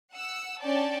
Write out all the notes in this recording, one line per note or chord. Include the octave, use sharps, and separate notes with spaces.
F#5 E6
C#4 D4 D5 G5 A5